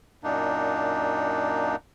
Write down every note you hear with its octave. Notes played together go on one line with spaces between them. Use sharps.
F#2 A#2 A#3 D4 D#4